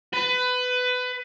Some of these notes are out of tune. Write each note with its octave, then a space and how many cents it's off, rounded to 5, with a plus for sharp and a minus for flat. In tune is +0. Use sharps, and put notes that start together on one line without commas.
B4 +20